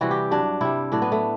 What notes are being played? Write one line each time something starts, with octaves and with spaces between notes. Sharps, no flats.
C3 E3 G3 F#4
G4
G2 F#3 D4
C3 G3 E4
A2 F#3 D4
B3
A3